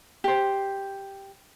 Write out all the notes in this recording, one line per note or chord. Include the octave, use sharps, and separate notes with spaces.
G4 C5